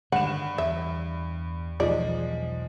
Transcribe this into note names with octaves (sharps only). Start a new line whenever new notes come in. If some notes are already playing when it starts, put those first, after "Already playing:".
G2 D3 D#3 F#5 E7
E2 E5
B1 E2 F3 G#3 D#4 D5